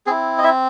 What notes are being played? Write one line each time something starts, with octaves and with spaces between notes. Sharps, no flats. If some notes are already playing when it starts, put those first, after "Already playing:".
C4 E4 G#4
D#5
E4 E5